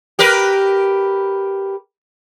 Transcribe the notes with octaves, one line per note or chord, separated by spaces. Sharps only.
G4 A#4 B4